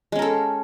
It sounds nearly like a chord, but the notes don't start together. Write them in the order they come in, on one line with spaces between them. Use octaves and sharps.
G#3 C#4 A#4 A4